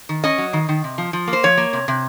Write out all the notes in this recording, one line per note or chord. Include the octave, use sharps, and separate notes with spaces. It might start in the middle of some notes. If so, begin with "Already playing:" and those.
D#3
C#4 D#5
F#3
D#3
D#3
C3
F3
F3
A#3
C5
F3 C#5
A#3
C3
C3